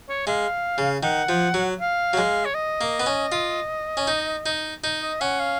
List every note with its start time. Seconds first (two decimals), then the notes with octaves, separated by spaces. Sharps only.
0.09 C#5
0.27 G#3 F5
0.78 C#3
1.03 D#3 F#5
1.29 F3
1.54 F#3
1.80 F5
2.13 F#3
2.17 G#3
2.45 C#5
2.55 D#5
2.81 A#3
3.00 B3
3.06 C#4
3.32 F4
3.97 C#4
4.07 D#4
4.46 D#4
4.84 D#4
5.02 D#5
5.21 C#4 F#5
5.40 F5